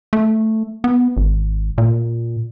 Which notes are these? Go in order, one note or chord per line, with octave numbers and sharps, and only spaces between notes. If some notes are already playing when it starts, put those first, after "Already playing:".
A3
B3
G#1
A#2